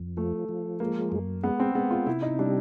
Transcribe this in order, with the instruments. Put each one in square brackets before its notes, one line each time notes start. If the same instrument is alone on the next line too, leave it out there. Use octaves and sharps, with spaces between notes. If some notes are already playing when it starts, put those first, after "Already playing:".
Already playing: [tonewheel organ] F2
[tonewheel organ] F3 [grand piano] A3
[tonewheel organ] F3
[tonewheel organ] G#3 [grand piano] A#3
[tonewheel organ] F#2
[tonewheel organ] G#3 [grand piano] B3
[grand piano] C4
[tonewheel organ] G#3 [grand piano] B3
[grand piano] F4
[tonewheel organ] C3 [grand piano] E4
[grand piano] D#4
[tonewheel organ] G3 [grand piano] D4